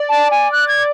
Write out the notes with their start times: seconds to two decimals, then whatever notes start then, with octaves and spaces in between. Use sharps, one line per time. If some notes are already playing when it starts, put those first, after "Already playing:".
Already playing: D5
0.09 A5
0.31 G#5
0.52 F#6
0.68 G#6